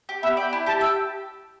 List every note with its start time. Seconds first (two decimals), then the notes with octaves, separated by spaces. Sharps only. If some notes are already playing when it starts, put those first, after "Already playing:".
0.09 G4
0.22 B3 E5
0.37 D5 G5
0.53 E4
0.66 G4 A5
0.81 G5 E6